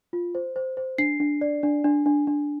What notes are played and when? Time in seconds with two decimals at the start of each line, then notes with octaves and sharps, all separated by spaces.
0.13 F4
0.35 C5
0.56 C5
0.77 C5
0.98 D4 C7
1.20 D4
1.41 D5
1.63 D4
1.84 D4
2.06 D4
2.27 D4